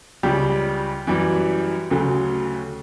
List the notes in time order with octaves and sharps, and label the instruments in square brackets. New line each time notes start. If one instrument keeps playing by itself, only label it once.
[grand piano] C#2 C#3 G3 G4
F#2 E3 G3
D2 C#3 F#3 A3